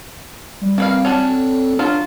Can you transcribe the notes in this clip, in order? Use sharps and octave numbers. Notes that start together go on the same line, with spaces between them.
G3
A#3 C4 B4 F5
C#4 D4 F#4
A4
F#3 D4 F4